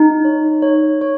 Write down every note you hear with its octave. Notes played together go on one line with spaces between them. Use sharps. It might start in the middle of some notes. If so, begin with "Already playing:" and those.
Already playing: D#4
C#5
C#5
C#5